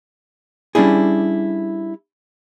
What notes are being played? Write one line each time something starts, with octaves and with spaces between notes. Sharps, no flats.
G3 C#4 D4 E4 G#4